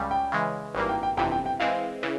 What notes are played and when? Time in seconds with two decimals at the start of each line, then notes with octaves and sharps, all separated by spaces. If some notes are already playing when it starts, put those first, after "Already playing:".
Already playing: C#2 C#3 G3
0.11 G5
0.32 C#3 E3 G#3
0.75 G#1 G2 E3 A#3
0.89 G5
1.03 G5
1.17 G1 F2 C3 E3 G5
1.32 G5
1.46 G5
1.60 E3 G#3 C4 F5
2.03 C#3 E3